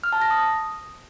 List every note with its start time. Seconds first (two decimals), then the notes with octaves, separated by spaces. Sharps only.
0.04 F6
0.13 A5
0.22 A#6
0.31 D#6